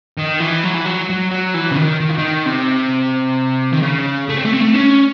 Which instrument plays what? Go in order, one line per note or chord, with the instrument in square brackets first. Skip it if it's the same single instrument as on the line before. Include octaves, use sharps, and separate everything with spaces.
[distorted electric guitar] D#3
E3
F#3
E3
F#3
F#3
F#3
E3
C#3
D#3
D#3
E3
D#3
C3
D#3
C#3
A3
C4
A3
C4
A3
C#4